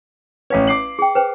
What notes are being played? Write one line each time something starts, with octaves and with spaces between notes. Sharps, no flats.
A1 B4 C#5 F5
D6 C7 F#7
G#4 G5
B4 C5 G5